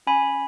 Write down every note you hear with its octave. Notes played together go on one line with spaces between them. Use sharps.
C#4 G#5 B5